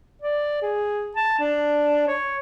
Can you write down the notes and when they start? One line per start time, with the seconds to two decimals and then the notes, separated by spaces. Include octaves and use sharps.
0.22 D5
0.62 G#4
1.16 A5
1.39 D4
2.08 C#5